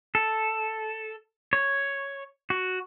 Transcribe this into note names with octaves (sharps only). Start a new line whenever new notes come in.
A4
C#5
F#4